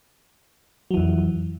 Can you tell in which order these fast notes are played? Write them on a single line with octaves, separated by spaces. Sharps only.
F#3 E3 F2